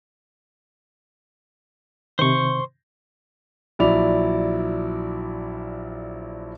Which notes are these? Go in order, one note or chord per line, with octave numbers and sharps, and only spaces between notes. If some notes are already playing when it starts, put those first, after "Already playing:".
C3 D#3 C5 C#6
A#1 F#3 E4 D5 F7